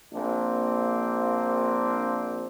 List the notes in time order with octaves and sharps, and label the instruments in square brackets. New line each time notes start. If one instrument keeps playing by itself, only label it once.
[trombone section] A#1 A#3 C4 D4